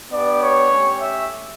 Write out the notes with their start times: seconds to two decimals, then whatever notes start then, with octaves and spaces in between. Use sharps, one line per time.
0.12 B3 D4 G4 D5
0.41 C#5
0.71 A3 C#4 G4
1.00 E5